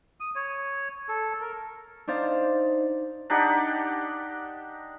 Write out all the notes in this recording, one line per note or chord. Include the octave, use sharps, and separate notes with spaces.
D#6
C#5
A4
A#4
D4 D#4 C5 F5 A6
D4 D#4 G4 F#5